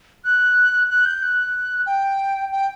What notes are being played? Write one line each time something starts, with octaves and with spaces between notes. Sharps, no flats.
F#6
F#6
G6
F#6
G5
G5